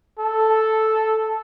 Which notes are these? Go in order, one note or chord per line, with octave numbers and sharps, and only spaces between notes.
A4